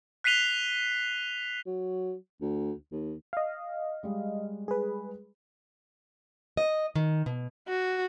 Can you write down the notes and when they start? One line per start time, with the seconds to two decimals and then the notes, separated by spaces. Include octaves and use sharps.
0.24 F#6 B6 C7 D#7 F7 G7
1.66 F#3
2.41 D2
2.92 D#2
3.33 D#5 F5
4.03 G3 G#3
4.68 G#4 B4
6.57 D#5
6.95 D#3
7.26 B2
7.68 F#4